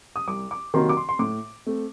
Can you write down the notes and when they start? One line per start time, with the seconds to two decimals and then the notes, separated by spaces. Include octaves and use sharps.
0.16 D#6
0.27 C2 D6
0.51 D6
0.74 C3 D#3 F#3 A#3 C6
0.89 D6
0.97 C6
1.09 C6
1.19 A2 D6
1.67 A3 C4